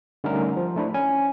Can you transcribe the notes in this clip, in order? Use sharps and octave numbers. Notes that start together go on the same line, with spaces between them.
D3 G3 A3 C#4 D#4 A#4
F3
A3 D4 E4
C#4 G#5